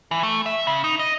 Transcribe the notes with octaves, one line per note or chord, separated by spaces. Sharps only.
E3
A3
E5
C#3
D#4
D#5